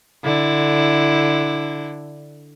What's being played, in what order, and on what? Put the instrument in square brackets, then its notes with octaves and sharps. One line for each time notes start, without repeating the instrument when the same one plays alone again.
[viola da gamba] D3 E4